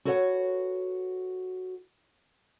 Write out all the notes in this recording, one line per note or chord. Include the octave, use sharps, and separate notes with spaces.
F#4 A4 B4 C#5 E5 F#5